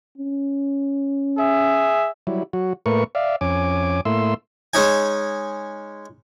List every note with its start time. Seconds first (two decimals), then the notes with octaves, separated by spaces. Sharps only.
0.17 C#4
1.38 G#4 E5
2.27 F#3 G3 E4
2.53 F#3 F#4
2.86 A2 A3 A#3 A#4 B4 C#6
3.15 D5 E5 F5
3.41 F2 C#4 G#5 D6
4.05 A2 A3 A#3 E4 C6 E6
4.74 G#3 C#4 D#4 G#5